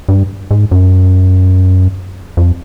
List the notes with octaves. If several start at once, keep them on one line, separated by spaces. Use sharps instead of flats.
G2
G#2
F#2
F2